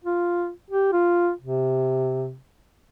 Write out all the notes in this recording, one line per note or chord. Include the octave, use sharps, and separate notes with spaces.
F4
G4
F4
C3